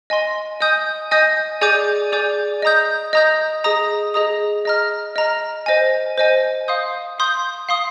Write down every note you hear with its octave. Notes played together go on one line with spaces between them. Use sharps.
D#5 G#5 C6
D#5 G#5 D#6 G6
D#5 G#5 D#6 G6
G#4 D5 G#5 D6 G6
G#4 D5 G#5 D6 G6
D#5 A#5 D#6 G6
D#5 A#5 D#6 G6
G#4 D#5 A#5 D#6
G#4 D#5 A#5 D#6
D#5 A#5 F6
D#5 A#5 F6
C5 D#5 G#5
C5 D#5 G#5
F5 C6 D#6 G6
F5 C6 D#6 G6
F5 C6 D#6